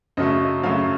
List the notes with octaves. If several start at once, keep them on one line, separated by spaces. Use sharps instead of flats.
F#2 C#3 F#3 A3 D#5
F#2 C#3 F#3 A3 F5